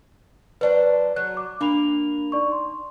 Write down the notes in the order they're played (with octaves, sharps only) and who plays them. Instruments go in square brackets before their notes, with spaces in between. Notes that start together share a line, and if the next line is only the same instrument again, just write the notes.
[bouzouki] F#3 D4 C5 [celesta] B4
[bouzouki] F#3 [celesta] F#6
[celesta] D6
[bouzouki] A#3 [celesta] D4 B5 F7
[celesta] D#4 D5 C#6
C6